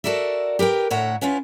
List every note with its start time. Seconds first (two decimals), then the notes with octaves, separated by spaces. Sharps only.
0.04 F#4 A4 A#4 D5 E5
0.59 G4 A#4 B4 G5
0.90 D2 A2 C#5 E5 F#5 A#5
1.21 B3 C#4 E4 F4